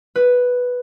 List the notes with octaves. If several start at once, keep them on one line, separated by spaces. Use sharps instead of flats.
B4